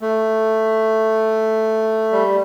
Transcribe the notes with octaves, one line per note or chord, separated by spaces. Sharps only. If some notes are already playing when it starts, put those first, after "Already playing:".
A3
G3